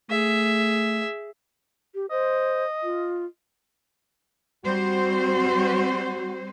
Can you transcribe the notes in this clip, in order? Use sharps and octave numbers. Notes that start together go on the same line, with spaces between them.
A3 G#4 E5
G4
C5 D#5
F4
G3 C4 F#4 C5